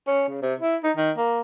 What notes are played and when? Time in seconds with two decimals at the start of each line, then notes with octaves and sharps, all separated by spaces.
0.07 C#4
0.29 C#3
0.42 C3
0.60 E4
0.84 D#4
0.97 D#3
1.17 A#3